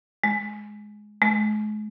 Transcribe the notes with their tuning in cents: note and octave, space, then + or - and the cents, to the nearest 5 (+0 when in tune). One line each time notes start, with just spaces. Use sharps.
G#3 +10
G#3 +40